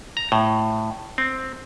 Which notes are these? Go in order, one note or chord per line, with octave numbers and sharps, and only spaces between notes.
A#5
A2
C4